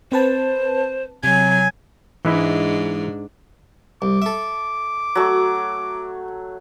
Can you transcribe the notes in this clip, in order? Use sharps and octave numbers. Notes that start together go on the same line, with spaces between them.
C4 B4 C5 A5
C3 F#3 G#5
G#2 E3 G#3 D4 E4
C2 D6
A4 E5
F#3 A3